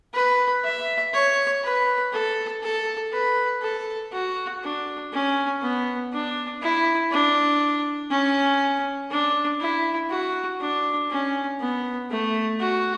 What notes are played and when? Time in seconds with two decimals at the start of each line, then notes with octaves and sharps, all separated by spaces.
0.14 B4
0.64 E5
1.14 C#5
1.64 B4
2.13 A4
2.63 A4
3.13 B4
3.63 A4
4.12 F#4
4.63 D4
5.13 C#4
5.62 B3
6.13 D4
6.62 E4
7.11 D4
8.11 C#4
9.11 D4
9.61 E4
10.10 F#4
10.60 D4
11.10 C#4
11.60 B3
12.11 A3
12.60 F#4